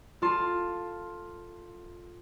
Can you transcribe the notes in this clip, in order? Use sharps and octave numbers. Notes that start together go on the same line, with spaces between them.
F4 A4 F5 A5 C6